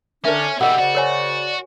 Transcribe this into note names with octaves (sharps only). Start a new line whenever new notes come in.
D3 C#4 D4 A4 A#4 C5 E5
B1 G3 A#4 D#5 F#5 B5 E6
C#3 F#4 C5 D5
A#4 C#5 G#5